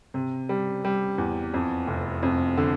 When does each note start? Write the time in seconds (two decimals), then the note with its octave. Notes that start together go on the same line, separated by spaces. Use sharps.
0.14 C3
0.49 G3
0.85 G3
1.18 E2
1.54 F2
1.87 F1
2.23 F2
2.57 D3